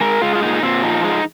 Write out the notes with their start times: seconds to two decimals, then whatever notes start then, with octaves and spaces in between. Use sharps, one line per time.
0.01 G#3 A#4
0.22 G#3 F4
0.35 F4
0.42 A#2 D#4
0.63 A#2 C4
0.83 F3 D#4
1.04 G#3 D#4